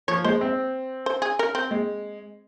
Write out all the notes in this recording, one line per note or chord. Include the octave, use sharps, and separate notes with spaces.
F3 C#5
G#3 C5
C4
C5
G#4
A#4
C4
G#3